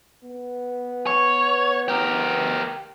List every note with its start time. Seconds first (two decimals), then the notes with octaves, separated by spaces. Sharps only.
0.24 B3
1.07 C#5
1.88 G4 A#4